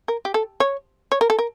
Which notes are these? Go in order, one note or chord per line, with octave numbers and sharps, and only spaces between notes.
A#4
G4
A4
C#5
C#5
A#4
A4
A#4